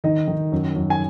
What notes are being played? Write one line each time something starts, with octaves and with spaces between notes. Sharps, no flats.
D#3 D#4 D#5
D#3
F#2
F#2
G#5